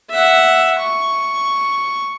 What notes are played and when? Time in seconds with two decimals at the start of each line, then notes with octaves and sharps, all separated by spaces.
0.10 E5 F#5
0.79 C#6